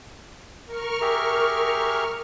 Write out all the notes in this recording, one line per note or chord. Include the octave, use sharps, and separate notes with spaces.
A#4 C#6 F6
G4 G#4 E5